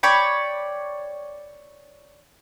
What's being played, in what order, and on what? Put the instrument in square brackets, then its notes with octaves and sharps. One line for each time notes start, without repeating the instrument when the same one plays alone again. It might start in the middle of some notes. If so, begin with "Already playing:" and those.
[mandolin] C#5 D5 G5 B5